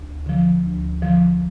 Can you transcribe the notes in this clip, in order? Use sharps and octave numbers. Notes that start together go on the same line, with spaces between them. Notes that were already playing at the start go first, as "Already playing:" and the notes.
Already playing: D2
D3 F3
D2
D3 F3